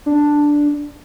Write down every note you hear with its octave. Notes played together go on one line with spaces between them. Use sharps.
D4